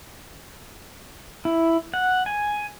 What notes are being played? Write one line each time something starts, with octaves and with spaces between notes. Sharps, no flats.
E4
F#5
G#5